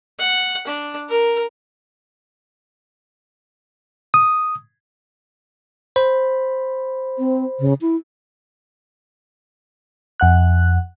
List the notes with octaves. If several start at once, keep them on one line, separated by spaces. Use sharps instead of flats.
F#5
D4
A#4
D#6
C5 B5
C4
C#3
E4
F2 F#5 F#6